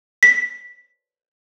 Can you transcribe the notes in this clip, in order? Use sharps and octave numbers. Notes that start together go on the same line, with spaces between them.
B6